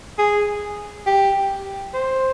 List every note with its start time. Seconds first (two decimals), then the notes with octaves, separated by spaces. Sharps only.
0.18 G#4
1.07 G4
1.94 C5